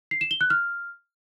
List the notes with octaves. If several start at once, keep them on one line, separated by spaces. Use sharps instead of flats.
C7
E7
G7
F#6
F6